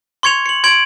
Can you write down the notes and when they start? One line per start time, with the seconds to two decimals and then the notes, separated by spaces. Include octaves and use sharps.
0.23 C6 C#6 G#6 C#7 F7
0.46 C#7 F#7
0.64 C6 G#6 D7 F#7